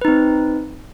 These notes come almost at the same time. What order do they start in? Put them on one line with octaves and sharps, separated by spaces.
B4 D#4 C4